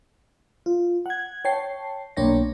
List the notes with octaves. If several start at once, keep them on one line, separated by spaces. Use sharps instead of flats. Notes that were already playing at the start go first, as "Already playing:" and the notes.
F4
F#5 G#6
C#5 G5 A5 C7
B1 A#3 D4 C#5 G5 A#6